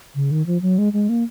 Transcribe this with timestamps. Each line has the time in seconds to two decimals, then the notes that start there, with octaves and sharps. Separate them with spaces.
0.15 C#3
0.31 D#3
0.46 F3
0.62 F#3
0.78 G#3
0.93 G#3
1.09 A#3